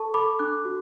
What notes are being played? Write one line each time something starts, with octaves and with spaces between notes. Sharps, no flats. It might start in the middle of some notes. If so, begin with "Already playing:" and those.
Already playing: A4 A5 C#6
A4 B5 D6
D4 D6 F#6
F#4